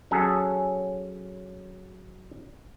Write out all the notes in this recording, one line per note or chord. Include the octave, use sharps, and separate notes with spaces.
F#3 C#4 G#4 A4 A5